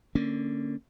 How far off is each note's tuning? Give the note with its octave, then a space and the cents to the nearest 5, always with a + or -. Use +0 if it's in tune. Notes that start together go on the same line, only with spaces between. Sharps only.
D3 +0 A#3 -15 C#4 +0